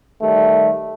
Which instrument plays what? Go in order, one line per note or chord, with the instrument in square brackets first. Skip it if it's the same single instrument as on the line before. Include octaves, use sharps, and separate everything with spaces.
[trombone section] D#3 G3 A3